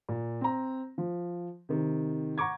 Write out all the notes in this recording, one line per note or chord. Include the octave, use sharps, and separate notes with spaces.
A#2
C4 A#5
F3
C3 D#3
F#5 A#5 C#6 D6 G#6